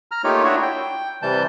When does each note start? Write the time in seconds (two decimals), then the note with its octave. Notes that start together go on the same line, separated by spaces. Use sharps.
0.11 A#5 F6
0.24 A3 A#3 D#4 F4 G4 C#5
0.44 D4 E4 F#4 C#5
0.62 G5
1.22 C3 E3 G3 A5 G6